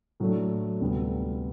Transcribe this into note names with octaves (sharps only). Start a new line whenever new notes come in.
A2 F#3 A3 D4
D2 C3 G3 B3